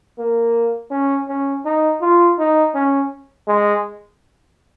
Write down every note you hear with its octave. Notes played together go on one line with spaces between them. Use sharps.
A#3
C#4
C#4
D#4
F4
D#4
C#4
G#3